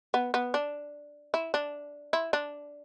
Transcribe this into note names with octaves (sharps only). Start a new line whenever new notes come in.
B3
B3
D4
E4
D4
E4
D4